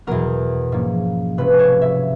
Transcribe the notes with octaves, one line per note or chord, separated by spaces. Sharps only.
E2 B2 F#3 B3 A#4
G#2 F3 A#3 C#4
C3 F3 G#3 C#4 B4
C#5
E5